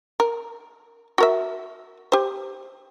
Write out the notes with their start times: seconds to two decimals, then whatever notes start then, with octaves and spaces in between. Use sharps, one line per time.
0.20 A#4
1.18 F#4 A#4 E5
2.12 G4 C5